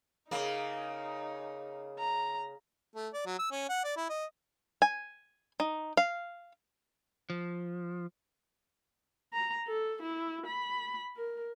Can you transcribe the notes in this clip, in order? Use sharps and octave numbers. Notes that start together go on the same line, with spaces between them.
C#3 A#3 D#4
A#5
A3
D5
F#3
E6
C#4
F#5
D5
E4
D#5
G#5
D#4
F5
F3
A#5
A4
E4
B5
A#4